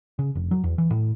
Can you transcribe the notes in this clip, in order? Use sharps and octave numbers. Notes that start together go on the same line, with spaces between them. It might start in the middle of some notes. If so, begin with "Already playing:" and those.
C#3
F1
F#3
E2
E3
A2